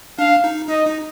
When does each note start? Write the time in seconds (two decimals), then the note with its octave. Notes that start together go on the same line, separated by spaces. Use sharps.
0.19 D4 F5
0.44 D#4
0.69 D#4 D#5
0.86 D#4